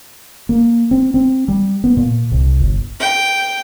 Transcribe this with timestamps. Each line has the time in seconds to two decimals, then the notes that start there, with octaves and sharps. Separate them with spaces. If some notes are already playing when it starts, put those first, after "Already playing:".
0.49 A#3
0.91 C4
1.14 C4
1.48 G3
1.84 B3
1.97 A#2
2.31 C2
2.60 G1
3.00 G5